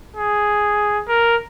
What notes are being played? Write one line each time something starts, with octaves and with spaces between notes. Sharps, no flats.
G#4
A#4